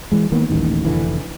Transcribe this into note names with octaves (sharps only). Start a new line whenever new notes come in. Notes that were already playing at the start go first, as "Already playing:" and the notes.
E3 G#3
D#3 A#3 B3
D#1 A1 D#2 D#3
F1 D3 E3